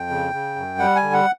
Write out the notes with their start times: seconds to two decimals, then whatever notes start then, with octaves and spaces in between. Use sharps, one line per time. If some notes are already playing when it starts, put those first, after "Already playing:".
Already playing: F2 G5
0.10 C#3
0.33 C#3
0.56 F#2
0.78 G3 F#5
0.96 G#5
1.03 D3
1.13 F#5